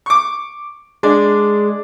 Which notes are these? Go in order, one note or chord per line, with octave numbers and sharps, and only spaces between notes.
C#6 D6
G#3 D4